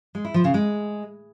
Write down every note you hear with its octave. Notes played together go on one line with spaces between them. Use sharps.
G#3
E4
F3
C#3
G#3